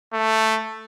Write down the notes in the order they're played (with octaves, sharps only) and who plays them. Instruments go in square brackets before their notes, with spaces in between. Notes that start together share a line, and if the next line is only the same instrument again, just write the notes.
[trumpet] A3